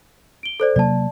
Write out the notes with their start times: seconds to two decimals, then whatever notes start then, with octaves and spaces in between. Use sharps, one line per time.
0.43 D7 G7
0.60 A4 C5 D5
0.76 C3 F#3 A#3 D5 A5